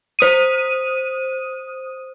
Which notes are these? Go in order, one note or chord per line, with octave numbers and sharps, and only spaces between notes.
C5 D#6 D#7